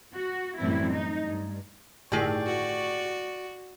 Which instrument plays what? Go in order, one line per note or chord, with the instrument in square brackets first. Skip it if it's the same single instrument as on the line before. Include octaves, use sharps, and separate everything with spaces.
[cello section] F#4
F#2 A2 E3 G3 C4 E4
D#4
G2
[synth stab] G1 A2 D#3 [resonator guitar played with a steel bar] G4 G#4 [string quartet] D5 C#6
[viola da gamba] F#4